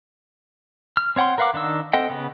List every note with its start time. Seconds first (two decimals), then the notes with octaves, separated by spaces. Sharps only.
0.97 F6
1.16 C4 C#5 F#5 G5 C6
1.38 A#4 B4 F5 F#5 D6
1.54 D#3 D4 D#4 E6
1.93 C4 A4 D#5 F#5 G5
2.10 C#3 B3